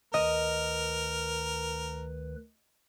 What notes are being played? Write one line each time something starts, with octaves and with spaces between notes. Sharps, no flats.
D2 D#3 A#4 B4 D#5